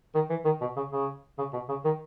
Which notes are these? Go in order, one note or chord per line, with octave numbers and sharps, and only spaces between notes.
D#3
E3
D#3
B2
C#3
C#3
C#3
B2
C#3
D#3